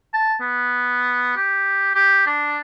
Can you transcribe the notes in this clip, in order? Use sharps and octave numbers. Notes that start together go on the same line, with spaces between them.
A5
B3
G4
G4
D4